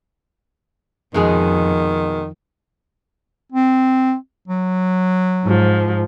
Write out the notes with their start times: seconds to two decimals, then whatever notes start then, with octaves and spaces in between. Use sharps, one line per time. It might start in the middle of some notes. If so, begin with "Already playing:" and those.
1.14 F2 B2 D#3 G#3 G#4
3.52 C4
4.48 F#3
5.45 G#2 F3